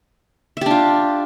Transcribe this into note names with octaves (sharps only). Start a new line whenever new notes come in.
D4 F4 G4 E5